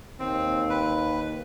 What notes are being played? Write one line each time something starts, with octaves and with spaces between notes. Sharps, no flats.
D#2 C4
B4